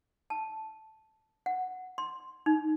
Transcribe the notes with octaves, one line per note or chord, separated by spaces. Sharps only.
A5
F#5
C6
D#4